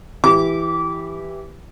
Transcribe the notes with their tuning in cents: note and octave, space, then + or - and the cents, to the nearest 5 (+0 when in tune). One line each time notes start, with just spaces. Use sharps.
E3 +0 G4 +0 D6 -25